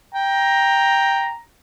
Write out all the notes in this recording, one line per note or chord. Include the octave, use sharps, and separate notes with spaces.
G5 A#5